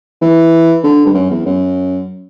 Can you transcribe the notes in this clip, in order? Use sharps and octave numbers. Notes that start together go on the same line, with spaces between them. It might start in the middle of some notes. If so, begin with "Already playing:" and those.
E3
D3
G2
F#2
E2
F#2